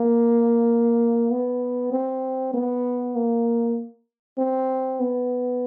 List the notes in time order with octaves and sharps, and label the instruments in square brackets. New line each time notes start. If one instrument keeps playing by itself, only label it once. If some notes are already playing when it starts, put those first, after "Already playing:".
Already playing: [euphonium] A#3
B3
C4
B3
A#3
C4
B3